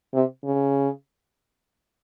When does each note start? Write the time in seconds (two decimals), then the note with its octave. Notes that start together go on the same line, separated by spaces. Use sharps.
0.14 C3
0.44 C#3